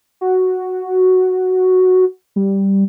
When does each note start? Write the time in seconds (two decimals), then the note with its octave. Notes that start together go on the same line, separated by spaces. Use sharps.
0.21 F#4
2.36 G3